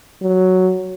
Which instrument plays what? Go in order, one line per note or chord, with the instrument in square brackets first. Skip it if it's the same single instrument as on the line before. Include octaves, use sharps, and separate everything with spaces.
[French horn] F#3